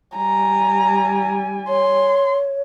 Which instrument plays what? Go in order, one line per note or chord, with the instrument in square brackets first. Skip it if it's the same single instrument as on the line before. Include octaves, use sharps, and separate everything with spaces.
[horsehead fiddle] G3 G#5 [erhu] A#5
[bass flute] C#5 [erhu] C6